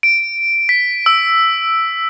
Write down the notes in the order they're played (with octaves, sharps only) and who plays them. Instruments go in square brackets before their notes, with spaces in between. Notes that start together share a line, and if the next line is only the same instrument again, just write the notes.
[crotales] D7
B6
E6